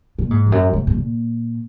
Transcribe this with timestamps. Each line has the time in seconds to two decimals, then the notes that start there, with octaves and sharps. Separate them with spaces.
0.19 A#2
0.31 G#2
0.47 F2
0.52 F#2
0.73 G#2
0.87 G#2
0.95 A#2